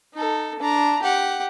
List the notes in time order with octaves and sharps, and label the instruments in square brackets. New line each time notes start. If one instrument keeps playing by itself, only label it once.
[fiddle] D#4 A4
D4 A#5
G4 F#5